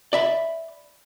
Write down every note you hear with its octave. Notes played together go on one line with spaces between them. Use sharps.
D5 E5 B5